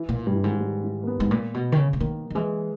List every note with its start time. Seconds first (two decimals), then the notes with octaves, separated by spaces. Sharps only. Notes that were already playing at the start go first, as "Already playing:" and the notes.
Already playing: E3
0.09 A#2
0.26 G2 G3
0.35 E3
0.43 G#2 D#3
0.51 E3
0.61 G3
0.84 E3
1.03 A#3
1.07 B3
1.20 G#2
1.31 A#2
1.54 B2
1.72 D#3
1.77 C#3
1.93 C#3
2.00 D#3 A#3
2.30 D#3
2.35 E3 G#3